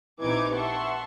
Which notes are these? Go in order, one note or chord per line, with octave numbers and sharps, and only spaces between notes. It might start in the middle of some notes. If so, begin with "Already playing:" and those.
A#1 C3 E3 D#4 D6 G#6
E5 F#5 A5 C6 C#6